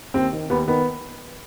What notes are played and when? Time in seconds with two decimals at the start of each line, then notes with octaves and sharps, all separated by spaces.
0.14 D#2 C4
0.33 D#3
0.50 D#2 B3
0.68 D#3 B3